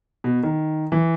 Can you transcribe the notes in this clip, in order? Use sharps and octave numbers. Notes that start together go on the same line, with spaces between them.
B2
D#3
E3